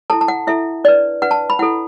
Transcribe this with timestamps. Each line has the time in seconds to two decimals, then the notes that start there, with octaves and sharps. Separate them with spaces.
0.10 E4 A4 A5
0.21 A5
0.28 F#5
0.47 E4 A4 E5
0.84 D4 B4 D5
1.22 D4 B4 F#5
1.31 A5
1.50 B5
1.59 E4 A4 F#5